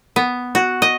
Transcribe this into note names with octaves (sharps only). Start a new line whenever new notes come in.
B3
F#4
D#5